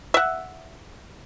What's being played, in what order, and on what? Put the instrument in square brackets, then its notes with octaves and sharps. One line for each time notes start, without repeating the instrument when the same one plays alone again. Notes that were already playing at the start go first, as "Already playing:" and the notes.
[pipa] E5 F#5